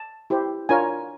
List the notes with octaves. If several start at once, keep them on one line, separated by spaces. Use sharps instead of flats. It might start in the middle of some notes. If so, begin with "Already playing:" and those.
Already playing: A5
E4 G4 C5
D4 F4 A#4 C#5 G#5